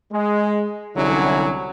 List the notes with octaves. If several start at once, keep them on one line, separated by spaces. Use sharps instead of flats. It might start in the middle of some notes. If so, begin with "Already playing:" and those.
G#3
C2 D3 F#3 C#4 E4